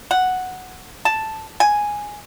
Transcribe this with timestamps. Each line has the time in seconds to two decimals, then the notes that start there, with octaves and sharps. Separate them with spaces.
0.11 F#5
1.05 A5
1.60 G#5